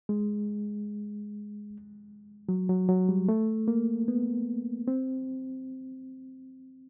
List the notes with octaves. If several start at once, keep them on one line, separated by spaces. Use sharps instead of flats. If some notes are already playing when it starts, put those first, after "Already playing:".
G#3
F#3
F#3
F#3
G3
A3
A#3
B3
C4